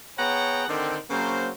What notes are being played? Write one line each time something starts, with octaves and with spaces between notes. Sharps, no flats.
B3 G#4 C#5 F#5 G5 A#5
D3 D#3 C4
C#3 F#3 A#3 C4 C5